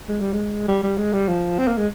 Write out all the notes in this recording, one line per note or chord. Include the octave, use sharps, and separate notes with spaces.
G#3
G3
G#3
G3
G3
G#3
G3
F3
C4
A#3
G#3